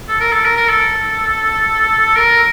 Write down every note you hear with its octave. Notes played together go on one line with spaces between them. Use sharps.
A4
A#4
A4
A#4
A#4
A4
A#4